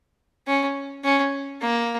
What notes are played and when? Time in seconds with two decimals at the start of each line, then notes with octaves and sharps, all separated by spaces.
0.47 C#4
1.04 C#4
1.61 A#3